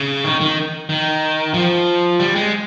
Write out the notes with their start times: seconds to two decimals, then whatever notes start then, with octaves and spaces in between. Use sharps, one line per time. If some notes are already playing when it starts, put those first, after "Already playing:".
Already playing: C#3
0.24 D#3
0.41 D#3
0.89 D#3
1.54 F3
2.20 G3
2.35 G#3